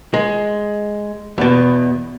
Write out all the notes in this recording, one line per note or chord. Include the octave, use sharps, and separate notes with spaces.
G#3
E2 B2